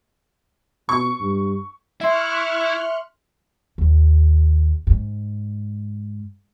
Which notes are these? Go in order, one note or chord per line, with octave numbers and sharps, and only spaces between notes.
B2 C#6
G2
E4 E5 C6 C#6 F6 F#6
D#2
G#2